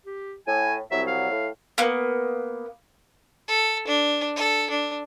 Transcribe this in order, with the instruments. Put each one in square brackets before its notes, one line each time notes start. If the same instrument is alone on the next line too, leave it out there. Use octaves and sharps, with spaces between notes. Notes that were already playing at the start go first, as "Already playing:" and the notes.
[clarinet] G4
[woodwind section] A2 [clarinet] G#5
[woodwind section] C2 F#3 [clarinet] E5
[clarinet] F5
[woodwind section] A2
[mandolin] A#3 B3
[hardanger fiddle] A4
D4
A4
D4